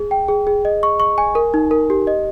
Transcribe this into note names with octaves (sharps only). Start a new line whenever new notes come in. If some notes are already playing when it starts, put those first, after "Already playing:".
Already playing: G#4
G5
G#4
G#4
D#5
C#6
C#6
G#5
A#4
D#4
A#4
G4
D#5